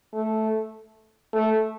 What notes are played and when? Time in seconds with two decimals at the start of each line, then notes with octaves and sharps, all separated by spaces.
0.14 A3
1.33 A3